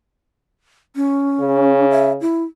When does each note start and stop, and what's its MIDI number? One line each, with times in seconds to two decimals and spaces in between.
0.96 1.86 61
1.40 2.20 49
1.91 2.12 76
2.21 2.43 64